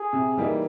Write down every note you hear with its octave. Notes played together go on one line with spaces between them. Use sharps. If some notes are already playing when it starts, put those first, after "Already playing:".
Already playing: G#4
C3
E3 G3 A#3 D#4